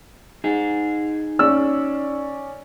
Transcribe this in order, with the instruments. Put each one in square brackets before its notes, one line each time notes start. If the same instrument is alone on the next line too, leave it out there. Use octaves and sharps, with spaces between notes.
[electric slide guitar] D#4 G#4
[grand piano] C#4 D5 [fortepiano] E6